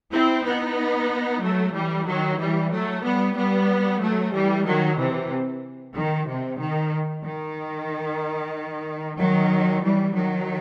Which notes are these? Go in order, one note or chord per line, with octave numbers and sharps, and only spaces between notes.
C4 E4
B3 D#4
F#3 A3
E3 G3
D#3 F#3
E3 G3
F#3 A3
G3 B3
G3 B3
F#3 A3
E3 G3
D#3 F#3
C3 E3
D#3
C3
D#3
D#3
D#3 F#3
E3 G3
D#3 F#3